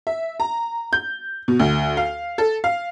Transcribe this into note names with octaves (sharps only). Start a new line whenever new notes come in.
E5
A#5
G6
B2
D2
F5
A4
F5